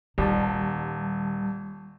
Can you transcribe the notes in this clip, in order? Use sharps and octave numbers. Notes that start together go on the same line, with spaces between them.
D#1 D#3 G3 A5